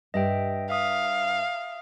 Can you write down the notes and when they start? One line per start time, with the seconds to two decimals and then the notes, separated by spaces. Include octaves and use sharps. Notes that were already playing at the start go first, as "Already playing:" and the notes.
0.14 G2 G4 D#5 E5 G5
0.70 E5 F5 D#6